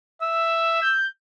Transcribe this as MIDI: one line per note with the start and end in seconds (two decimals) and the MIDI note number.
0.22 0.80 76
0.22 0.96 88
0.82 1.05 91